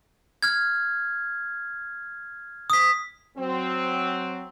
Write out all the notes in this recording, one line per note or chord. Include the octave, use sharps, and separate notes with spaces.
F6 G#6
D#6 B6
F#3 C4